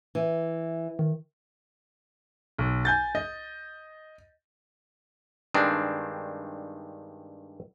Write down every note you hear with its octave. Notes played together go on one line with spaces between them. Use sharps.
E3
D#3
B1
G#5 G6 A6
D#5
G2 D#3 G#3 C4 D4